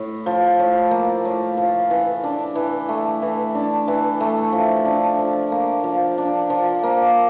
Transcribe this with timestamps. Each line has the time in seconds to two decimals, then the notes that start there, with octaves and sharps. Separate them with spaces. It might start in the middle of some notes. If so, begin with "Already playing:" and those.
Already playing: A2
0.26 F3
0.59 A2
0.91 A#3
1.25 A2
1.57 F3
1.91 E3
2.24 D4
2.55 E3
2.89 A3
3.22 E3
3.55 D4
3.88 E3
4.20 A3
4.53 F3
4.85 D4
5.19 F3
5.51 A#3
5.84 F3
6.18 D4
6.50 F3
6.83 A#3